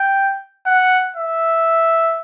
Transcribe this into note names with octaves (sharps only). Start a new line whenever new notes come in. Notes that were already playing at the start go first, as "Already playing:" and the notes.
Already playing: G5
F#5
E5